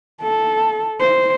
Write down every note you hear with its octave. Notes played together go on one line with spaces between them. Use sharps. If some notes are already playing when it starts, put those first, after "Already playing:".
A4
C5